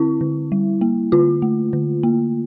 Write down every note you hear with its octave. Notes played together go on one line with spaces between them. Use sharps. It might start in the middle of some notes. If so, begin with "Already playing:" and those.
Already playing: D3 C4 E4
D3
G3
A#3
D3 F4
A3
D3
A#3